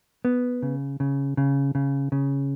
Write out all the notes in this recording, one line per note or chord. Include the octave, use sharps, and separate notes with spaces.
B3
C#3
C#3
C#3
C#3
C#3